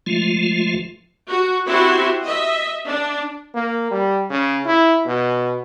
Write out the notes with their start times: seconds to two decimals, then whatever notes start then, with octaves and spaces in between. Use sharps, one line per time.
0.06 F3 G#3 A3 F4
1.28 F#4
1.67 C4 E4 F#4 G4 C6
2.24 D#5 E5
2.88 D4
3.54 A#3
3.91 G3
4.30 C#3
4.65 E4
5.06 B2